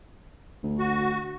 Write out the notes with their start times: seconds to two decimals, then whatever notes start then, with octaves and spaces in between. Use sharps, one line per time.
0.63 D2
0.78 F#4